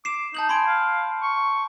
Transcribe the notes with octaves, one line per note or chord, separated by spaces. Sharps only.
D6 C7 E7
D#4 A5 G6 F#7
G#5 B5 C6 D7
F5
C#6